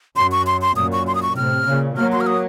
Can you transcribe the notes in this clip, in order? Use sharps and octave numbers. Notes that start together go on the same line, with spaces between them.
F#2 C6
C#6
C6
C6
F#2 A#2 D#6
C#6
C6
D#6
C#6
A2 C3 F6
A#2 C#3
F#3 A#3 F6
C6
F6
D#6